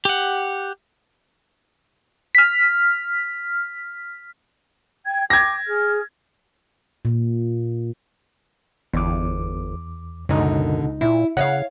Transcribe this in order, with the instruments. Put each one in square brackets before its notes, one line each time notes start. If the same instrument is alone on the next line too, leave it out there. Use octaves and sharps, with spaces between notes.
[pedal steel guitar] G4 F#5
[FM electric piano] F6 B6
[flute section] G5 G#6
[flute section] G5 D6 [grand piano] G#6 A#6
[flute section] G#4 F6
[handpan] A#2
[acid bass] G1 [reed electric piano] E2 D6
[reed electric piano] C#2 D#4 [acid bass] F#2 [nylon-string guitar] B2 D3
[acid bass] A#2 [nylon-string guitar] E4
[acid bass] C#3 [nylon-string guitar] C#5 D#5 F5 [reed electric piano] F#5